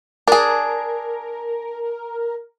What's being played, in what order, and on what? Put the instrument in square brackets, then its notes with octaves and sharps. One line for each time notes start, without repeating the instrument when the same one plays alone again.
[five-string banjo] D4 G#4 [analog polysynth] A#4